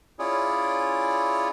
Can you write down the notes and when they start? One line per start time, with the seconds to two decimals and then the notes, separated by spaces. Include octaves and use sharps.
0.19 C#4 E4 F4 G#4 C#5 D5